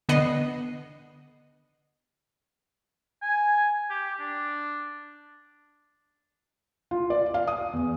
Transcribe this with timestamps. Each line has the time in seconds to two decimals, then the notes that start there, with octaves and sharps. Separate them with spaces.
0.09 D3 B3 D#5 F#5 C7
3.22 G#5
3.90 G4
4.19 D4
6.91 F4
7.10 D5
7.34 F5
7.48 D#6
7.73 E2